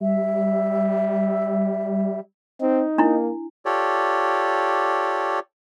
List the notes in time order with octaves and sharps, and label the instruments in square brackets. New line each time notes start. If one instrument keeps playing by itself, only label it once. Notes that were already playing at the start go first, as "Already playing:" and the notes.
[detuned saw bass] G3 [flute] E5
[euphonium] C4 [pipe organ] D#4
[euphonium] A#3 [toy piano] D4 E4
[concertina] F4 G4 A4 C#5 D5